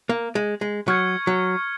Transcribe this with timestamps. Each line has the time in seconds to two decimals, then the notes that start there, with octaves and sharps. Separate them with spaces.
0.09 A#3
0.35 G#3
0.61 G#3
0.88 F#3 C#6 F6 G#6 C#7
1.27 F#3